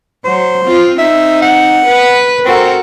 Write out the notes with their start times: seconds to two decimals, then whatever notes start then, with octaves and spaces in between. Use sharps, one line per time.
0.25 F#3 C5
0.66 C4 F4
0.99 C4 D#4 E5
1.42 F#5
1.86 B4
2.46 C4 F#4 A4 A#4